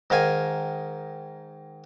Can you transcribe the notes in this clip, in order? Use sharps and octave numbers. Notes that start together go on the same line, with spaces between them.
G#2 D#3 F5 G#5